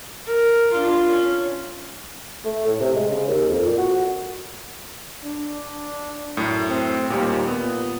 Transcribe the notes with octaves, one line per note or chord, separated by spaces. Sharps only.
A#4
D4 F4
C#4
A3
A2
C3
G#3
C#3
D#2
F2
A#2
F#4
D4
F#2 A2
C4
D#2 A#2 G3
A#2 B3